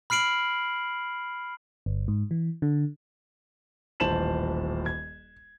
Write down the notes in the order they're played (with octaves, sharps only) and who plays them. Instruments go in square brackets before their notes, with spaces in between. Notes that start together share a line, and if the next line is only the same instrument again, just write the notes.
[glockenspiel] B5 F6 C7 D7 F#7
[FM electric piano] G1
G#2
E3
D3
[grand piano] D#1 A1 C5 A5 E7 F#7
G#6